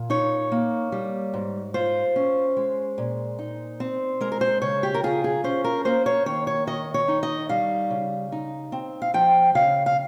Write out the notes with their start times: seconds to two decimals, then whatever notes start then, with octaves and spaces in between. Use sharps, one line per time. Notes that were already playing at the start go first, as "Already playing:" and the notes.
Already playing: A#2
0.10 D#4 C#5
0.52 A#3
0.92 G3
1.34 G#2
1.74 F4 C5
2.16 C#4
2.57 G#3
2.98 A#2
3.39 D#4
3.80 C4
4.21 G#3 A#4
4.32 A#4
4.41 C5
4.62 C#3 C#5
4.83 G4
4.94 A#4
5.03 F4 G#4
5.24 G#4
5.44 C#4 C5
5.64 A#4
5.85 A#3 C5
6.06 C#5
6.26 D#3 C#5
6.47 C#5
6.67 D#3 D#5
6.94 C#5
7.08 D#4
7.23 D#5
7.49 G3 F5
7.90 C#3
8.32 D#4
8.72 C4
9.02 F5
9.14 F3 G5
9.55 C#3 F5
9.86 F5